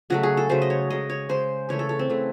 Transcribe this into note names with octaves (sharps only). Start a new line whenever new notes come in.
C#3 F#3 A3 F#4
G#4
A4
C#3 F#3 A3 C5
D#5
C#5
C#3 G#3 D#5
C#5
C#3 G#3 C5
C#3 E3 A3 C#5
A4
A4
C4
C#3 E3 A3